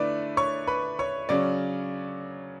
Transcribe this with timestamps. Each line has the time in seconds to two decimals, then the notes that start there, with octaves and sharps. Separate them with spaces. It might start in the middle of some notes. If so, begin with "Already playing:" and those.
Already playing: D3 A3 E4 B4 D5 D6
0.37 C#5 C#6
0.67 B4 B5
0.99 C#5 C#6
1.29 C#3 F#3 C#4 D5 D6